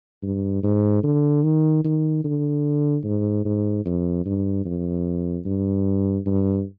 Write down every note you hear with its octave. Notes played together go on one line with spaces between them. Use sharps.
G2
G#2
D3
D#3
D#3
D3
G#2
G#2
F2
G2
F2
G2
G2